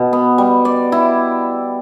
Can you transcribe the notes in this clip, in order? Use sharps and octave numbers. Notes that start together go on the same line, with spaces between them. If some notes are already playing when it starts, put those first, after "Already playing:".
Already playing: B2
B3
G3
D5
E4